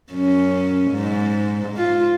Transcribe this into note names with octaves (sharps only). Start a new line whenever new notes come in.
F#2 C#4
G#2
F4